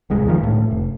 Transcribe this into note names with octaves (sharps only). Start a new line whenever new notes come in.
D1 C2 G#3
E2 D#3 F3
C#2 A2
F1